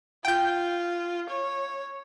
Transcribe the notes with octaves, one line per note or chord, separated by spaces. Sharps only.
F4 G5 G6
C#5